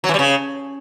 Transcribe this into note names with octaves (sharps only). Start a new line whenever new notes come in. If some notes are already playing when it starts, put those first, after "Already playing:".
F#3
E3
G3
C#3